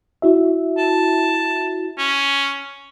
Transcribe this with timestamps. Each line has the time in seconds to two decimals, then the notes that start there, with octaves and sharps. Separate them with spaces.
0.22 E4 F#4 E5
0.78 A5
1.98 C#4